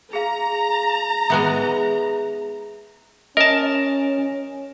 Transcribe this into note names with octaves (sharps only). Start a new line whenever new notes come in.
G#4 F5 A#5
G#3 B3 D#4 G#4 E5
C#4 A#4 D#5 A5